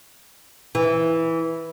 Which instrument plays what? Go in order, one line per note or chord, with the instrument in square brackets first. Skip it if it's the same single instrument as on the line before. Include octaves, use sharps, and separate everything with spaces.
[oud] E3